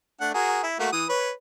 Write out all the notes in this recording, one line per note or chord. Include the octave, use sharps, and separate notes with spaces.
A3 D4 F#5
F#4 G#4 A#4
E4
A3 A#3 F#4
E3 D#6
B4 C#5